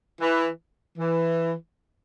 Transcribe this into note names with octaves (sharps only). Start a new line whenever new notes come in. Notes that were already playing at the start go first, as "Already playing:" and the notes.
E3
E3